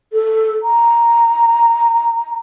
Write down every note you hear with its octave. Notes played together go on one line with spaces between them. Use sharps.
A4
A#5